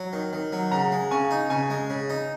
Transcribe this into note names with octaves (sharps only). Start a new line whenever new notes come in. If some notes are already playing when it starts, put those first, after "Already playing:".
Already playing: F#3
D#3
D#3
F#3
C#3 F#5 A#5
G#3
C#3 G#5 C#6
D#4
C#3 G#5 C#6
G#3
C#3
D#4